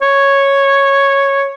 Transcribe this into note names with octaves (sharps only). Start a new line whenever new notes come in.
C#5